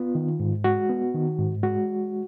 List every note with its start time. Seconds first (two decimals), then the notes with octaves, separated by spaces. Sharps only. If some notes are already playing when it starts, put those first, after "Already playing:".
Already playing: B3 F4
0.15 D#3
0.40 G#2
0.64 G#3 F#4
0.90 B3
1.15 D#3
1.38 G#2
1.63 G#3 F#4